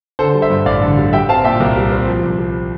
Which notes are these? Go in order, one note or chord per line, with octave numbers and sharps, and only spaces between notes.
D3 A4 C5
G3
C5 E5
G2
A1 D5 F5
D3
G3
G3 E5 G5
C4 F5 A5
A#2 E5 G5
C2 A#4
G3
C4
F3
C2
C3